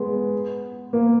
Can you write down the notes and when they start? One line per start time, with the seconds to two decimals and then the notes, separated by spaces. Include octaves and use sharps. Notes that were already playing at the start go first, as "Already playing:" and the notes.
Already playing: G#3 B3
0.93 A#3